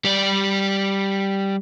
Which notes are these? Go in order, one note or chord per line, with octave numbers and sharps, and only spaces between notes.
G3 D5